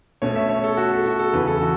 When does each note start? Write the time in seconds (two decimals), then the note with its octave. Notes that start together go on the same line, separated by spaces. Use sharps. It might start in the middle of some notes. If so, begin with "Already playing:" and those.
0.22 B2 A3 C#4 C#5
0.35 E5
0.49 C#5
0.64 A4
0.77 F#4
0.91 A4
1.06 F#4
1.19 A4
1.33 E2 C#3 E3 C#4 B4
1.47 A4
1.61 F#4